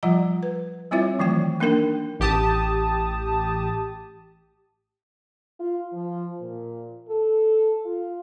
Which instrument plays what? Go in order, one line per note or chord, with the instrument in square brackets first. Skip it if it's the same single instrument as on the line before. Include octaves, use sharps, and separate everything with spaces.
[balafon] F3 G3 F4 F#5 A#5
B4
G3 C4 E4 F4 C#5 E5
D#3 E3 F#3 A3 G5
A#3 D4 D#4 A#4 G5
[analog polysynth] A1 G4 A5 D#6
[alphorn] F4
F3
A#2
A4
F4